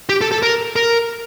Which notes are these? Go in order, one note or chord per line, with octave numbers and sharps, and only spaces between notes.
G4
A4
A4
A#4
A#4